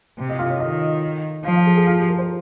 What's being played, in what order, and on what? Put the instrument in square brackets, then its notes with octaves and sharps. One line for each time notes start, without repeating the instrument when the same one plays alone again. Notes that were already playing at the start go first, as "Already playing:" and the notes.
[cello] C3
[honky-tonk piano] D#5
F4
C#5
[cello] D#3 [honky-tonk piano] D#5
[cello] F3 [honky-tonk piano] F5
[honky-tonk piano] F5
G#4
G#4
F4
G4
A#4
C5